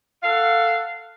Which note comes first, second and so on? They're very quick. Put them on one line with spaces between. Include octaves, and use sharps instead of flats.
F5 A4 F#5